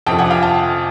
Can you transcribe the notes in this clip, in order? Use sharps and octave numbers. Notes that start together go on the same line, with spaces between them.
F2 C3 F3 A3 G5 A5
F#5 G#5
F5 G5
G5 A5